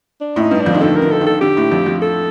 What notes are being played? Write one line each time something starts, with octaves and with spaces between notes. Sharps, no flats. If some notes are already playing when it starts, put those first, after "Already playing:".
D4
A2 D#4
G2
D4
F2
D#3
D3 A4
A#4
D3
A4
D#3
A4
D3 G4
A2
F2
F2
A4